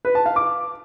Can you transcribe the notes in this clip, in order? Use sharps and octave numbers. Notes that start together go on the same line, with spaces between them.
B4
A5
F5
D6